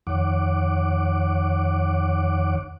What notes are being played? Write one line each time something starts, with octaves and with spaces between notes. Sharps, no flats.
F2 D#3 C#5 F#5 D6